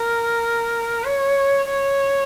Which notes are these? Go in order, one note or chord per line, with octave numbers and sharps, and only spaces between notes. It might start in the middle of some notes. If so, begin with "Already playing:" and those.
Already playing: A#4
C#5
C#5